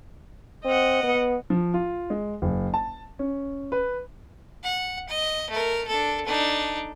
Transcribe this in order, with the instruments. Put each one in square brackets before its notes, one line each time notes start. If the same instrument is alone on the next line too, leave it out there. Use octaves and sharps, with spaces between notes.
[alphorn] C4 [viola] D#5 F#5
[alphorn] B3
[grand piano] F3
F4
G#3
F#1
A5
C#4
B4
[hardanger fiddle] F#5
D#5
A3 A#4
D4 A4
D4 D#4